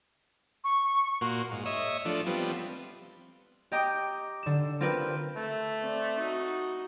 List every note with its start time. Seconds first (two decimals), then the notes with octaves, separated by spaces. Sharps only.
0.64 C#6
1.21 A#2 A#3 F#4 C6
1.52 G#2
1.66 C#5 D#5 E5
2.05 F3 A3 D4
2.26 F3 G3 B3 C4
3.72 G4 D#5 G5 A#5 D6
4.43 D3 E7
4.80 C4 F4 G4 A#4 B4
5.36 A3
5.80 C4 D5
6.18 D#4 F#4